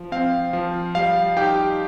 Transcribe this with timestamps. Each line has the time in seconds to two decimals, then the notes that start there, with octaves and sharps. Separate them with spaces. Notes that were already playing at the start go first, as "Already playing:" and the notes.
Already playing: F3
0.12 C4 F5
0.53 F3
0.95 G3 F5
1.37 D#4 G4 G5